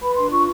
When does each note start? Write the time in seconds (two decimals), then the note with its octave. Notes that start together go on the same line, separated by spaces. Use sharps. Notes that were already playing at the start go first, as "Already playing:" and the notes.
0.02 B4 B5
0.17 D4 C6
0.31 F4 C#6